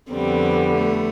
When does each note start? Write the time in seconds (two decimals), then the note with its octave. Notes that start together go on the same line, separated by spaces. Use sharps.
0.11 F2 D3 G3 B3 C4
0.76 A3